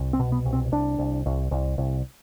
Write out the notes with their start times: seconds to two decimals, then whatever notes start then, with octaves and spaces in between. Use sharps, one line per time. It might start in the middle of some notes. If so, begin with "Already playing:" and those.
Already playing: C2
0.13 C4
0.20 B2
0.32 B3
0.45 C2
0.53 C4
0.72 C2 D4
0.99 C2
1.26 C2
1.51 C2
1.78 C2